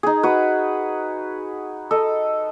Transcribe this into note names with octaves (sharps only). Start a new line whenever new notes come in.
D#4 G#4
F#4 B4
A4 D#5